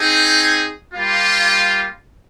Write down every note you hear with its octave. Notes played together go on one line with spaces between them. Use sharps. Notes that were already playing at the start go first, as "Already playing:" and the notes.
Already playing: C4 D#4 G#4
G3 A#3 F4